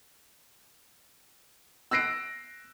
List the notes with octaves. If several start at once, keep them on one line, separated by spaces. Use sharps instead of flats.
E6 F#6 A#6 C7 D7